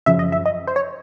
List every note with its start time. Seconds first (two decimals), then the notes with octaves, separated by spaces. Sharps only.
0.06 F#2 C#3 F3 E5
0.19 D#5
0.32 E5
0.46 D#5
0.67 C5
0.76 C#5